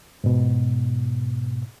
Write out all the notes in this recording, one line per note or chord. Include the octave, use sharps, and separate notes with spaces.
G#2 B2